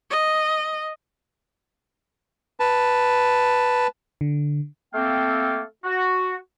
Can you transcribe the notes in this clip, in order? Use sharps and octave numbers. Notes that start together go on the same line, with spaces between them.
D#5
B4 A5
D3
A3 A#3 C4 A4 F5 G5
F#4